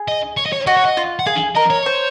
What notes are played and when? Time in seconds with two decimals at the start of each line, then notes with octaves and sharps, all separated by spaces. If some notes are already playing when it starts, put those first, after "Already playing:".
Already playing: G#4
0.08 D#5
0.37 C#5
0.46 D#5
0.53 C#5
0.67 F#4 D#5
0.77 C#5
0.85 D#5
0.97 F4
1.19 F#5
1.26 G#4 F5
1.56 A#4 D#5
1.70 C#5
1.86 C5